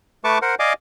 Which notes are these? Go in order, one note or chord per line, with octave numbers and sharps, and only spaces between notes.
A3 B4 A5 C#6 D6
A#4 C5 F#5
D5 D#5 F5 G#5 D6